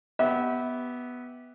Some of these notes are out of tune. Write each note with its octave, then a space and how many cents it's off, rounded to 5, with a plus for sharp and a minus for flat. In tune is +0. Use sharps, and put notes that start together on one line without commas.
B3 +0 G4 -10 E5 -25